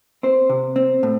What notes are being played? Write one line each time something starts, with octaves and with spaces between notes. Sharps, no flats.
C4 C5
C3
C4
A2